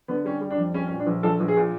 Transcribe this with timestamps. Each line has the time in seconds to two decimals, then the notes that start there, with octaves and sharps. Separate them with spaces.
0.08 D3 B3
0.25 G3 C#4
0.41 G3
0.50 D4
0.58 F2
0.74 G3 C#4
0.87 C#4
0.91 A#2
0.99 D4
1.07 A#1
1.23 A#1 A4
1.40 A#1
1.48 G#4
1.56 A#2